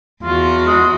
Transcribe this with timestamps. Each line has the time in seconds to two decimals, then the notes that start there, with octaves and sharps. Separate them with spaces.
0.24 E2 F4 F#4
0.66 G#3